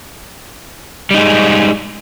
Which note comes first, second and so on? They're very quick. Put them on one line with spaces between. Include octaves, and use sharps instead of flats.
G3 D#4 G#3